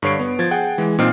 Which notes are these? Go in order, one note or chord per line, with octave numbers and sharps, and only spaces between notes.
G2 D3 C#5 C7 D7
B3
F3 G#6 A6
G#4 F#5 G5
E3 G#3
A#2 C4 D#4 G5 F6 C7